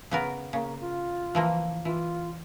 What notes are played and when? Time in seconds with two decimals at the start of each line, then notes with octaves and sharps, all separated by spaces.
0.11 C#3 B3 A#4
0.53 C#3 A#3
0.81 F4
1.35 E3 F3 A#3
1.85 E3 F4